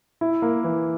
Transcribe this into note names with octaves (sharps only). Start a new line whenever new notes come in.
E4
A#3
E3